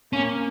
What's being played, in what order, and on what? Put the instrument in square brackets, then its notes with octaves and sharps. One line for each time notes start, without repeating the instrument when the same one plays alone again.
[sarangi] A#3 [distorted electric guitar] C#4